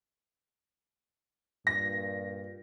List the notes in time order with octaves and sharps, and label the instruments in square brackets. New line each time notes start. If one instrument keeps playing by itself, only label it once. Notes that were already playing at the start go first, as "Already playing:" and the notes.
[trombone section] G2 A#2 [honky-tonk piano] A#6